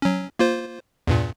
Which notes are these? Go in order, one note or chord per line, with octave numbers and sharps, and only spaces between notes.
F#3 C#4
A#3 F4 C5
E2 G2 A#2